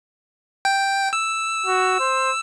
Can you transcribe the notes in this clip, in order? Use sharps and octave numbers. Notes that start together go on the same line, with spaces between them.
G5
E6
F#4
C5